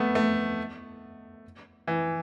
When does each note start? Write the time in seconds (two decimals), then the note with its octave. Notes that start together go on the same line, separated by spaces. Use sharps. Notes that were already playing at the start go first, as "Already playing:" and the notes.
Already playing: A3 B3
0.15 A3
1.88 E3